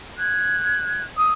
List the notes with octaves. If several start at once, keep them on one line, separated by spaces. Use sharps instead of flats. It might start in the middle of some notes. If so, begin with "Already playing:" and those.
F#6 G#6
D#6 E6